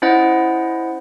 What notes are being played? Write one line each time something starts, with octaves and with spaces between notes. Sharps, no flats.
C#4 E4 C5 D#5 F#5